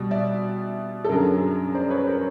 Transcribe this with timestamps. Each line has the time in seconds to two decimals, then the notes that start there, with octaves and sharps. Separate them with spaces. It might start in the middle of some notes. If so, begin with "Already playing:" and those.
Already playing: B2 G3
0.11 D5 E5
1.04 A4
1.09 F#2 D3 F#3 G#4 A#4
1.74 C5 D5
1.90 B4 C#5
2.06 A#4 C5